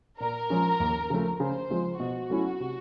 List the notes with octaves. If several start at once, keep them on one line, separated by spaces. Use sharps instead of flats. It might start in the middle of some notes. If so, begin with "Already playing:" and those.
A#2 A#4
F3 G#3 C#4
D#2
C#3 F3 A3
C#3 C5
F3 G#3 C4 F4
B2 F#4
F#3 A3 C#4 E4
C3